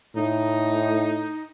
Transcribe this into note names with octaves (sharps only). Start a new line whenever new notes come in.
A2 D#4